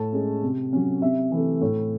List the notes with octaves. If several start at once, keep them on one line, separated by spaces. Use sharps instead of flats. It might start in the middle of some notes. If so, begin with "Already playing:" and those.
Already playing: A2 A5
G#3 C#4
C3
F#3 C#4
C3 E5
E3 A3
A2